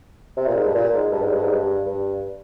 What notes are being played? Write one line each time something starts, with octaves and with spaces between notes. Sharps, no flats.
C3
A#2
G#2
G2
A#2
G#2
G2
G#2
G2
G#2
G2
G2